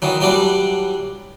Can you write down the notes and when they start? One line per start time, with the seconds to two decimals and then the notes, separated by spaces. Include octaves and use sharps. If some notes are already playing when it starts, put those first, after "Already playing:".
0.02 D#3 E3 F#3
0.21 E3 F#3 G3 D4